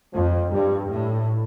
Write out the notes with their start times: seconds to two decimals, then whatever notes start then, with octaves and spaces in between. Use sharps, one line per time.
0.14 F2 F3
0.52 G2 G3
0.90 A2